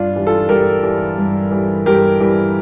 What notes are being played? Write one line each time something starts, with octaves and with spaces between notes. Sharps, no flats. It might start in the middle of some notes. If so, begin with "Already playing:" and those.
Already playing: G2 D4 F4
E3 G3
F4 A4
G2 G4 A#4
E3 G3
G2
E3 G3
G2 G4 A#4
E3 G3